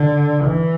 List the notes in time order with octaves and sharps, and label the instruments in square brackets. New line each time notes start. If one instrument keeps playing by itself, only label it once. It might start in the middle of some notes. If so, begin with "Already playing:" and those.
Already playing: [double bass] D3
E3